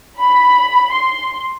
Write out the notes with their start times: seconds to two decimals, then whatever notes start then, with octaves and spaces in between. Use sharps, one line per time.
0.20 B5
0.93 C6